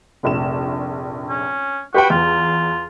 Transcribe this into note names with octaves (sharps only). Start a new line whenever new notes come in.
F1 A#1 E7
C#4
F#4 G4 B4 G5
E2 F4